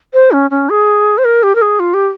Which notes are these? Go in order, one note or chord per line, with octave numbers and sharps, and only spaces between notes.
C5
C#4
C#4
G#4
C5
A#4
G4
A#4
G#4
F4
G4